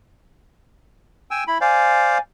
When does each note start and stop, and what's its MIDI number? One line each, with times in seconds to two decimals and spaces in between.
1.31 1.44 79
1.31 1.44 80
1.31 1.44 88
1.48 1.58 64
1.48 1.58 83
1.61 2.18 72
1.61 2.18 74
1.61 2.18 77
1.61 2.20 80